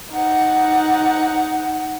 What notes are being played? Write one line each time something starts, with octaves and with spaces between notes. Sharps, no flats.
D#4 F#5